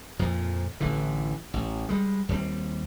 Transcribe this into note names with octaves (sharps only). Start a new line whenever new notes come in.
F2 A#2 F3
A1 D3 E3
A1
G3 G#3
D#2 G3 A3 C4